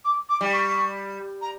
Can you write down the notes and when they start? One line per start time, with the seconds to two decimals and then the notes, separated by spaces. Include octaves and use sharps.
0.05 D6
0.29 D6
0.41 G3
0.53 C#6
1.42 A#5